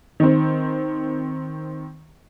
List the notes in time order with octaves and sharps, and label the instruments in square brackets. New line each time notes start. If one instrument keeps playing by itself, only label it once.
[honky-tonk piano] D#3 C4